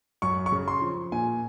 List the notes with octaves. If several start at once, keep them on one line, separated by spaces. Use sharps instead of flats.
F#2 C#6
C#6
C#3
C6
F3
A#2 G#5